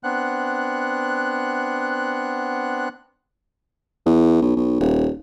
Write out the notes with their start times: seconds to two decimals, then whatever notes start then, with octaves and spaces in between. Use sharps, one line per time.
0.04 B3 C4 D4 F#5 F#6
4.06 E2
4.42 B1
4.56 B1
4.80 D#1